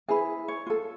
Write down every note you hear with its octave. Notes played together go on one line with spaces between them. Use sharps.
E4 G#4 B4 G#5
C#5
F4 A4